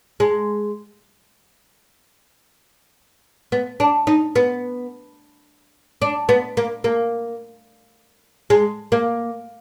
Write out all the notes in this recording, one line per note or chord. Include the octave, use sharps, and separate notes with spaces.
G#3
B3
D4
D#4
B3
D4
B3
A#3
A#3
G#3
A#3